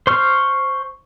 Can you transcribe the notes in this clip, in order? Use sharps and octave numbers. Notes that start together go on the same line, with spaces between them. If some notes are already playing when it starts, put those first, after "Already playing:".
C5 C#6 F6